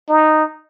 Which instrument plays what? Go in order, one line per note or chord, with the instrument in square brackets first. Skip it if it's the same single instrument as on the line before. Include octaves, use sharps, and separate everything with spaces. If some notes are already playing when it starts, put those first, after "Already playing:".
[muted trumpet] D#4